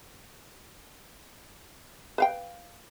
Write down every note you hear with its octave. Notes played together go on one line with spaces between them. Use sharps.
B4 F5 G5